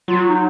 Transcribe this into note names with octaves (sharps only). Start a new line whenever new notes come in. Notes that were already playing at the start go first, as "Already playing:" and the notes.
F#3 F4
D#4